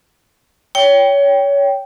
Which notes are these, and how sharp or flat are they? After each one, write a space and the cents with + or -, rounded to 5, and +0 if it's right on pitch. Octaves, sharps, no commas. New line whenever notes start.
C#5 +25 G5 +0